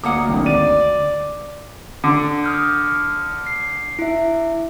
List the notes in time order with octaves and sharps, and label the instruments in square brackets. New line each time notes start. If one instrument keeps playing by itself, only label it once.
[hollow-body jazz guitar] D2 A#3 F#5 [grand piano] D6 D#6
[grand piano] G#1 D3
[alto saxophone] D5 [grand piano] D#7
[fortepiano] D3
[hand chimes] D#6 F6 G6
C7
E4 E5